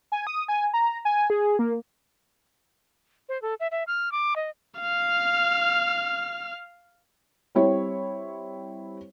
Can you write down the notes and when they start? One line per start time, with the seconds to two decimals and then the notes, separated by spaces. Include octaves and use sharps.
0.12 G#5
0.27 D#6
0.48 G#5
0.74 A#5
1.05 G#5
1.30 G#4
1.59 A#3
3.29 C5
3.42 A4
3.60 E5
3.71 E5
3.87 F6
4.12 D6
4.36 D#5
4.80 F5 F6
7.55 G3 C4 E4 C#5